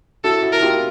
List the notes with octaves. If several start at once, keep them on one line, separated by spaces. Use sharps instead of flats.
E4 F#4 A4
E4 F#4
A#4
F4 G4